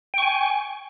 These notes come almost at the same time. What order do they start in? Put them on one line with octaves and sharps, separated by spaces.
G5 C#6 G#5